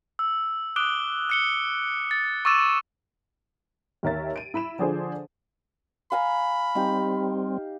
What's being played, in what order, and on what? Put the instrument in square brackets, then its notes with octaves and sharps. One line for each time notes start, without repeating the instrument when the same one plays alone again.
[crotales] E6
D6 D#6 F#6 D7 G7
F#6 C#7 G7
A6
C#6 D6 E6 A6 D#7 E7
[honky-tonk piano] D#2 D#3 A#4 C#5 E5 A6
D7 D#7
E4 B5 D7 E7
D3 F3 D4 G#4 A4 C5
[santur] F5 G#5 A#5 [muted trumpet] B5
[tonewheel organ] G3 C4 [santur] D#4 G4